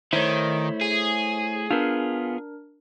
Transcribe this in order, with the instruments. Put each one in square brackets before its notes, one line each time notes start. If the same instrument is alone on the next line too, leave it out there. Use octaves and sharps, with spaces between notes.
[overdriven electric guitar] D#3 [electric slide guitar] A3 E4 [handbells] C5 C#5
[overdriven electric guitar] G#4
[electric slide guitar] B3 F4 [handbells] D4 A#4